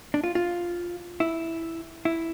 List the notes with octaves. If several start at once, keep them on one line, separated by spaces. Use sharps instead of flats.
D4
F4
F4
E4
E4